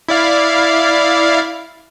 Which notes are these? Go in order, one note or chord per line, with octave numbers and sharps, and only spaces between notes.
E4 D5 F5